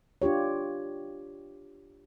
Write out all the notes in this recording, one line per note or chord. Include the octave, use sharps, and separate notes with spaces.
D4 F4 G4 C#5